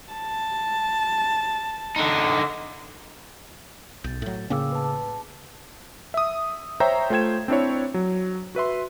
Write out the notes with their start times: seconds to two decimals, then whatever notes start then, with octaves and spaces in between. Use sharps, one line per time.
0.13 A5
1.96 D3 D#4
4.04 B1 G6 A6
4.22 A2 F#3
4.50 A2 C#3 A#3 C#4 G5 D6 E6
4.72 B4 A5
4.84 A5
6.14 E5 D#6
6.80 C5 C#5 E5 G5 A#5 G6
7.10 A3 F4 C5 G5 G#6 E7
7.48 C4 D4 E4 C#5
7.94 F#3
8.55 F#4 B4 E5 C6